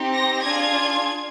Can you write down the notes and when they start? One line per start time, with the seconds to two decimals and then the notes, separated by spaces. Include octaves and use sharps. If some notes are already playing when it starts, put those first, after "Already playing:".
Already playing: C4 D#4 G4
0.13 A#6
0.43 D4 F4 G#4 G#6